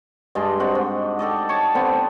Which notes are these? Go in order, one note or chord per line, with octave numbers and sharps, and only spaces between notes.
G2 G#3 D4 D#5
C4 F#4 F#5
G#2
G4 A4 D5 D#5
C#5 A5
D3 B3 C4